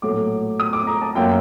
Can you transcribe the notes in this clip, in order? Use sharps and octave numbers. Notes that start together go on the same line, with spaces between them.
A#1 A2 F#3 A3 D6
D#6
D6
A#5
A5
F#2 F#3 A#3 G5